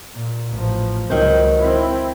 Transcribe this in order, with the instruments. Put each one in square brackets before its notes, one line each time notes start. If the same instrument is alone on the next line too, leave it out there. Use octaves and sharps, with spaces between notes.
[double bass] A#2
A1 F3
[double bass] C#2 [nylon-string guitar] D#3 F#3 C5
[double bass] C4 E4